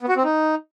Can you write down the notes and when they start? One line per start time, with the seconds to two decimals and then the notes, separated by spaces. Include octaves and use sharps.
0.01 B3
0.09 F#4
0.16 C4
0.24 D#4